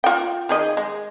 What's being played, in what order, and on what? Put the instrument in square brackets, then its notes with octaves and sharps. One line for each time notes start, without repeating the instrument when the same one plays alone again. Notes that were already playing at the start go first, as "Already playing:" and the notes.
[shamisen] F4 G5
D#3 G#4 D#5
G#3